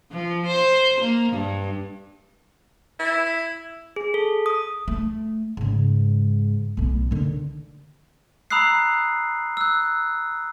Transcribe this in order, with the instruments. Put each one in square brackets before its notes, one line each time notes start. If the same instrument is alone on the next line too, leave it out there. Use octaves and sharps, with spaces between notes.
[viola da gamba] F3
C5
A#3
G2
[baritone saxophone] E4
[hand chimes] G#4
A4
D#6
[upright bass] A3
G#2 C#3
B1 A2
D3 D#3
[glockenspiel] A#5 B5 D#6 E6 F#6 C7
E6 F#6